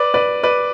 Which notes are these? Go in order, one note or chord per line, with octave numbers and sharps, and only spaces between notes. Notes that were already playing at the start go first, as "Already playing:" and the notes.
Already playing: B4 D5
B4 D5
B4 D5